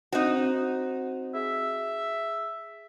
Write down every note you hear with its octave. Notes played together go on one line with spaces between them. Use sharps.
C4 D#4 F#4 C5
G#4 E5